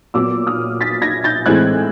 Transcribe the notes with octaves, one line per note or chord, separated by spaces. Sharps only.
A#2 F#3 B3 D6 E6
D#6 F6
A6 B6
G#6 A#6
G6 A6
A2 E3 G#3 C4 F#6 G#6